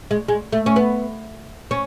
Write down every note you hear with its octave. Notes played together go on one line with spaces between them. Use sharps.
G#3
G#3
A3
C#4
B3
C#4